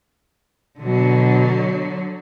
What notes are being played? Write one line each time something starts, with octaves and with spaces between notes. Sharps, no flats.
B2 D3 F#3